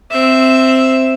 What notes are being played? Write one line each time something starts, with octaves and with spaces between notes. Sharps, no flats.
C4 E5